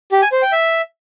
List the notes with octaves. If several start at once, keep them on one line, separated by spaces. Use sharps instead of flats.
G4
G#5
C5
G5
E5